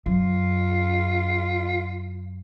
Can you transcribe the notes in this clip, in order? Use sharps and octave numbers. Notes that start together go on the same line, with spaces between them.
F#2 F4